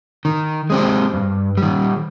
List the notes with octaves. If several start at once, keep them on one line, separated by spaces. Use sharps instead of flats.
D#3
G#3 C4 G4
G2
D#3 G3